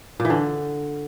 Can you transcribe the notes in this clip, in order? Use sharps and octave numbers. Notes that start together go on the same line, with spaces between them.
A#2
E3
D3